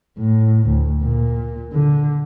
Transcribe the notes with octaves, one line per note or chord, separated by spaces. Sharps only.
A2
D2
A#2
D3